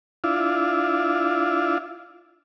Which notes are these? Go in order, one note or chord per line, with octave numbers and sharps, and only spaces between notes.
D4 E4 F4